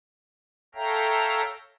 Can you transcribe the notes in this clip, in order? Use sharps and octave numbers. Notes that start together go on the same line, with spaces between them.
A4 C#5 E5 F5 G5 A#5